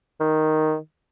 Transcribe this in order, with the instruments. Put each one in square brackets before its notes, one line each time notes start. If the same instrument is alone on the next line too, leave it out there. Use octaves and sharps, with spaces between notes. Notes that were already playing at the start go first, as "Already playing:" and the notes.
[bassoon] D#3